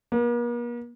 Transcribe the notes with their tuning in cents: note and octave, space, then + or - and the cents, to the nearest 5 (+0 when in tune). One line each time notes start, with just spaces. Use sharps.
A#3 +45